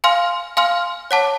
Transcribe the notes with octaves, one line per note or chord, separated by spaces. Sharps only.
F5 G#5 C6 F6
F5 G#5 C6 F6
C#5 F#5 A5 D6